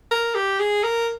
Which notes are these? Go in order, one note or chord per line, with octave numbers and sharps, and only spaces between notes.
A#4
G4
G#4
A#4